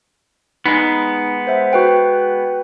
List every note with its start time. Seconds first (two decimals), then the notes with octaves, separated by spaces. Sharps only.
0.66 G#3 B3 D#4 B5
1.47 C5 E5 F#5
1.73 F#4 B4 G5